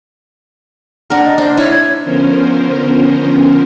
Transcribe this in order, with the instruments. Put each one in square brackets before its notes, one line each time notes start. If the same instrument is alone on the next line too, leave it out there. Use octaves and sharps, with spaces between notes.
[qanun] D4 A#4 [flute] F#5
[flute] D#5
[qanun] D4 [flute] C5
[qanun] E4 [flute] C#5
[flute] G#6
[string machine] D3 F3 B3 C#4 A#4 C5